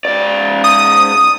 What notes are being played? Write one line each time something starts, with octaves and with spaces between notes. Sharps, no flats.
G#2 D5
D#6